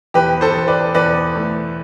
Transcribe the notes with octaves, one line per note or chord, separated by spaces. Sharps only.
E2 G4 B4
A4 C5
E2
B4 D5
E2 B4 D5
A3